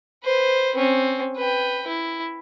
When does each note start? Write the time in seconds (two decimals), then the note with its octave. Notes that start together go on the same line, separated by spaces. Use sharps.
0.24 B4 C5
0.75 C4 C#4
1.37 B4 G5
1.87 E4